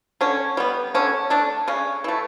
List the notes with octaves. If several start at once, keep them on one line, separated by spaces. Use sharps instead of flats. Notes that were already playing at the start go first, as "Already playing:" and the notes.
D3 C#4
G3 B3
D3 C#4
A3 D4
C#3 C#4
E3 A3